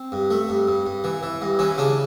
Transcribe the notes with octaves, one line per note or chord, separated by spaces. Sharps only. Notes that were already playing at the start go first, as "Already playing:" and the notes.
Already playing: C4
G2
A3
G2
G2
G2
E3
E3
G2
E3 C#4
C#3 D4